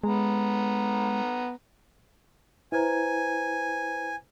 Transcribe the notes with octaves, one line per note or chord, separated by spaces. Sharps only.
G#3 B3 A#5
E4 B4 C5 G#5 A#5 G#6